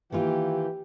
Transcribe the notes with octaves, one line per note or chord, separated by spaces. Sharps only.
D#3 E3 A#3 F4 G4